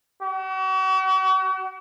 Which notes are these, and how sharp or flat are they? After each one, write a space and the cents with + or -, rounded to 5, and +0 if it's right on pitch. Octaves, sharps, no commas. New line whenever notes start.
F#4 +40